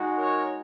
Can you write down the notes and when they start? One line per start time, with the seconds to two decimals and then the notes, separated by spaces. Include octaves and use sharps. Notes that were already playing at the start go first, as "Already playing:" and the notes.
Already playing: G#3 D#4 F#4
0.17 A#4 C#5